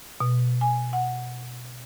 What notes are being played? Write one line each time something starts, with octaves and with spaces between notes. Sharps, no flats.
B2
G#5
F#5